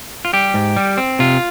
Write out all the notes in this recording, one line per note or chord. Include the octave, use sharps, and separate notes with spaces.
F4
G3 G4
G#2
G3
C4
C3 F4